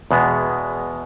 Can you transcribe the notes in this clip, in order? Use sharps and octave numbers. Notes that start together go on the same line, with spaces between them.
E2 B2 G#3 B3